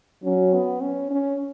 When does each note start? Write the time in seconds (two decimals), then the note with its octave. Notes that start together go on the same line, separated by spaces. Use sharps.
0.24 F#3 C#4
0.53 B3
0.82 C#4
1.11 C#4